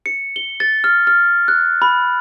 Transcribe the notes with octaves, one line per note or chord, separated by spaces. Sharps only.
C#7
G7
A6
F6
F6
F#6
B5